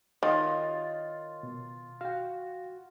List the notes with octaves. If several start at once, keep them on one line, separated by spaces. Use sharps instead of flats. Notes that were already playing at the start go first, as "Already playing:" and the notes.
D#3 F4 A#4 C#5 D#5 F5 G5 D#6
B2
F#4 F5 G5